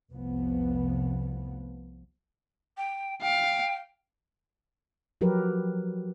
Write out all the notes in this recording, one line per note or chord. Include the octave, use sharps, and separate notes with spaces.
F1 C2 F3 B3
G5
F5 G5
F3 F#3 G4 A#4 B4